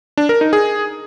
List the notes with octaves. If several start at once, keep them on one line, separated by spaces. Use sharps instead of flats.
D4
A#4
D#4
G#4